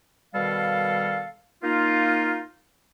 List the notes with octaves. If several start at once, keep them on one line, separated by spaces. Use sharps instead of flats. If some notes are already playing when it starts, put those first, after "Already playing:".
B2 D#3 G3 A4 F5
A#3 D#4 F4